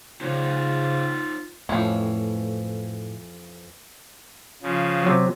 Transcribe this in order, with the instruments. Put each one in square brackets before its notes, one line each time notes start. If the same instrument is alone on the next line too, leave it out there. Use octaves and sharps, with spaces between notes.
[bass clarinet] C#3 [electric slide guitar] D#4 C5 C#5 [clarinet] F4
[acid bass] F2 [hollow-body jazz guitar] A2 [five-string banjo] E3 F3 C#4
[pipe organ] C#3 F3
[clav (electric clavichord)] C3 F#3